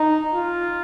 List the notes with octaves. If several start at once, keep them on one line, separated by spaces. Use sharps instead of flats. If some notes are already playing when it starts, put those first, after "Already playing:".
Already playing: D#4
F4